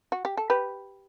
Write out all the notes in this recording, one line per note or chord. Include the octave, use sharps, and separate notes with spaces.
F#4
G4
A4
G4 B4